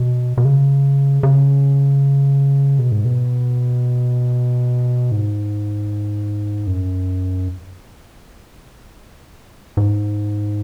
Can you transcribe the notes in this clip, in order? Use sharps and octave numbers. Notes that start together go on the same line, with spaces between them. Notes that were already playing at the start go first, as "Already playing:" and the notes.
Already playing: B2
B2
C#3
C#3
B2
G#2
B2
G#2
F#2
G#2